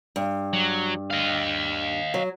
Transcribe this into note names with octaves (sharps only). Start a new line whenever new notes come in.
G2
F#3
D#5 F5
F#3